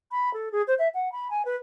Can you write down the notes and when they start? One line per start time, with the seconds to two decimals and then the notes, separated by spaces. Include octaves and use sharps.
0.11 B5
0.34 A4
0.52 G#4
0.68 C5
0.79 E5
0.94 F#5
1.12 B5
1.30 G#5
1.45 B4